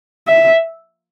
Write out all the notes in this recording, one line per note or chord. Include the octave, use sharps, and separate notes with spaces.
E5